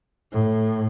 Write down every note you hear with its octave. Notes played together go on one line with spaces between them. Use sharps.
A2